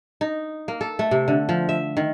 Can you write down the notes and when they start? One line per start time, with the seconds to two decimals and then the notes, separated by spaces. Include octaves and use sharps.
0.21 D#4
0.68 A#3
0.81 A4
0.99 A3
1.11 C3
1.28 D3
1.49 F3
1.69 E5
1.97 D#3